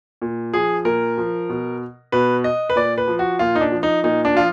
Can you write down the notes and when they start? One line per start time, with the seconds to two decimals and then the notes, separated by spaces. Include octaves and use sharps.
0.22 A#2
0.53 F3 G#4
0.85 A#2 A#4
1.18 F3
1.50 B2
2.12 B2 B4
2.44 D#5
2.70 B4
2.76 A#2 D5
2.98 B4
3.08 F3
3.19 F#4
3.39 A#2 F4
3.55 D#4
3.61 D4
3.72 F3
3.83 D#4
4.04 A#2 D#4
4.25 D4
4.35 F3 F4